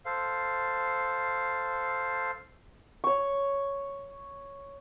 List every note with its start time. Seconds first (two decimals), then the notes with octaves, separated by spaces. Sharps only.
0.05 A4 C5 F5
3.04 C#5 C#6